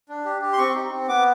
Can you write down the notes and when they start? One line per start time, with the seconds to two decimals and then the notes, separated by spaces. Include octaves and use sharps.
0.09 D4
0.25 G4
0.42 G4
0.53 C6
0.58 C4 C#6
0.75 D#4
0.92 C4
1.08 B3 D6